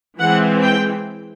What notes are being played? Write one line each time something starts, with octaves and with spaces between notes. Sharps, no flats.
E3 G#3 C4 F#5
G5